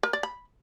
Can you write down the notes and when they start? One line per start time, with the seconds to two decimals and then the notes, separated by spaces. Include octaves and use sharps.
0.03 A#4
0.13 D5
0.23 B5